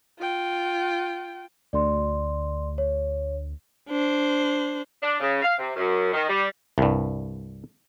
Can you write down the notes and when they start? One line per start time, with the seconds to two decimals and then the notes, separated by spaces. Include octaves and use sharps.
0.19 F4 G5
1.73 D2 D5 C6
2.78 C#5
3.89 D4 C5
5.01 D4
5.20 C#3
5.41 F5
5.58 C3
5.76 F#2
6.13 D#3
6.28 G3
6.78 C2 G2